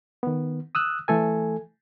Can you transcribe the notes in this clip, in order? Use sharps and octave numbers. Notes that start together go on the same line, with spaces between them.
D#3 B3
D#6 E6 F#6
E3 A3 A4 G#5